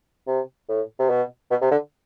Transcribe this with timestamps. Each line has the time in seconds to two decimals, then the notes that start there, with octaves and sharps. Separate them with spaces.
0.27 C3
0.69 A2
0.99 C3
1.10 B2
1.51 B2
1.61 C3
1.71 D3